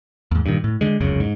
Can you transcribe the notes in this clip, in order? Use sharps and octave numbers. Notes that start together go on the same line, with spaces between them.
D#2 G#2
G2 A#2 D#3
A2
D3 G#3
F1 C#2 F#2 C#3
G#2